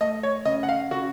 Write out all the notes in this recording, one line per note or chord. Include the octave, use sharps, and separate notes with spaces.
A3 D#5
C#5
C#3 D#5
F#5
F5
C#3 F#4